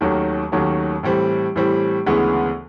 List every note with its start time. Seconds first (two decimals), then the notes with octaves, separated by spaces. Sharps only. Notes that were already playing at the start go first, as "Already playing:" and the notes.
0.01 D#2 D#3 F#3 A3 C#4
0.52 D#2 D#3 F#3 A3 C#4
1.03 A2 E3 G3 C4
1.56 A2 E3 G3 C4
2.06 D2 C#3 E3 G#3 B3